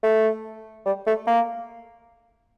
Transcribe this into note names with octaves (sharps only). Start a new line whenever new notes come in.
A3
G3
A3
A#3